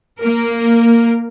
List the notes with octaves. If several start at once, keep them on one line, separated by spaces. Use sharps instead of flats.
A#3 A#4